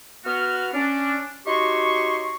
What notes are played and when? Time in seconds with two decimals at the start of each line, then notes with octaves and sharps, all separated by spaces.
0.25 B3 F#4 F6
0.73 C#4 D4
1.47 D#4 F#4 G4 C#5 C6 C#6